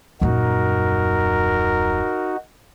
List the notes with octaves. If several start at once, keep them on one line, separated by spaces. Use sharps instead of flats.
D#1 F#2 D#4 F#4 A#4